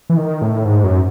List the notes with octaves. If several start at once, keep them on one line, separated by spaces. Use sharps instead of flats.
E3
D#3
A2
G#2
F#2